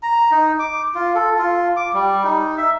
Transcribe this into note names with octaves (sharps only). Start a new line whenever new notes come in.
A#5
D#4
D6
F4
A4
F4
D6
G3
D#4
E5